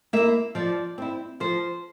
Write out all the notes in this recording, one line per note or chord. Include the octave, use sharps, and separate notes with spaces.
A#3 E4 E5
F3 D5
C4 E4
F3 C5